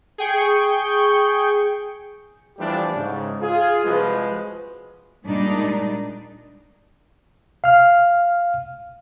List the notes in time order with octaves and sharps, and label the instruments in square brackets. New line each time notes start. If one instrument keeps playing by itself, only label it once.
[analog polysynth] G#4 G5 C#6 G6
[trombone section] E3 F3 G3 A3 D4 G4
G#2 C#3
F4 G#4
C2 F3 G#3 F#4 B4
[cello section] A#2 G3 G#3 D4 D#4
[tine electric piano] F5 F6